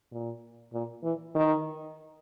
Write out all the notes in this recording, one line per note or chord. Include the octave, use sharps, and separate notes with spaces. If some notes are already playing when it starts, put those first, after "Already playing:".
A#2
A#2
E3
D#3